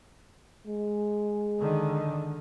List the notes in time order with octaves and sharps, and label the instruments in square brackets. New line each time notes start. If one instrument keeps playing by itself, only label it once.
[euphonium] G#3
[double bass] D3 D#3